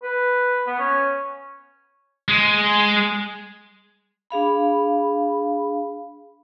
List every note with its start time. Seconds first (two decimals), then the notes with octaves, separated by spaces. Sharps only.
0.03 B4
0.67 B3
0.79 C#4
2.28 G#3
4.30 D4 G#4 F5 B5